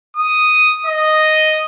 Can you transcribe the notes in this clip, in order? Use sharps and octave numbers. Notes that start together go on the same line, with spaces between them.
D#6
D#5